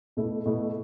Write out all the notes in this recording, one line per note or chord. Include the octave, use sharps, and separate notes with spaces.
B2 A3 E4
B2 A3 E4